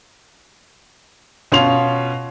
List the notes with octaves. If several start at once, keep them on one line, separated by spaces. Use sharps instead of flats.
B2 C#4 F4 C6 F7